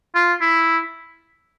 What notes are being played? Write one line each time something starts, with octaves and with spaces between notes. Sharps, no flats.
F4
E4